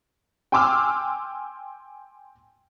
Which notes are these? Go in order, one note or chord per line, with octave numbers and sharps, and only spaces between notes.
G5 G#5 C6 D6 E6 F6